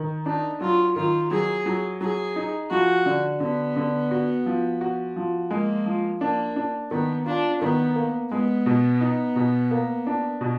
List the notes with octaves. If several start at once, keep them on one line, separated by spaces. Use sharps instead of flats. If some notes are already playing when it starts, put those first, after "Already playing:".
Already playing: D#3
D4 D#4
F#3 F4
D#3 F4
F#3 G#4
F#3
F#3 G#4
D#4
F3 F#4
D3
D3 B3
D3
F#4
F3
F#4
F3
G#3 A#3
F3
A#3 D4
D4
D#3 B3
D4 F4
D#3 B3
A#3
G#3 B3
B2
D#4
B2
A#3
D4
B2